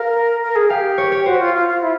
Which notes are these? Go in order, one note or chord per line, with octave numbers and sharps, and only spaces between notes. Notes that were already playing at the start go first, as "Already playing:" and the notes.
Already playing: A#4 F5
A#4
G#4
G4 F5
C#5
C#5
F#4 C5
F4
F4
F4
E4